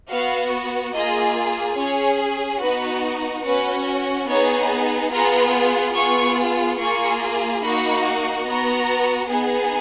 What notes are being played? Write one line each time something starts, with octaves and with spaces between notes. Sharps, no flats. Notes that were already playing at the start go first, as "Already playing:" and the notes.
B3 F#4 F5
A#3 F4 G#4 D#5
C#4 G#4 C#5
B3 D#4 F#4 B4
C#4 F#4 B4
B3 D#4 G#4 C#5
B3 F4 G#4 A#5
B3 F4 G#4 C#6
A#3 F4 G#4 C#6
A#3 D#4 F#4 B5
B3 F#4 A#5
B3 D#4 G#4